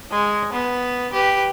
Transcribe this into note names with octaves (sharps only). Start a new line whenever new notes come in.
G#3
B3
G4 B4